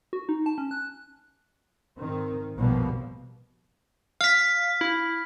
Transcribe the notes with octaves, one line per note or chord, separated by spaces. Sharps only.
F#4
D#4
A5
C#4
F#6
G#2 D#3 C4
A#1 F2 B2 F3 G3 A#3
F5 F6 B6
E4